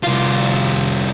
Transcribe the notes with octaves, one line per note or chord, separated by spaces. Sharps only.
C2 F4